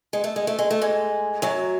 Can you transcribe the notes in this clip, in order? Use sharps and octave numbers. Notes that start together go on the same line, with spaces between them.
G#3
A3
G#3
A3
G#3
A3
G#2 G#3
F#2 F#3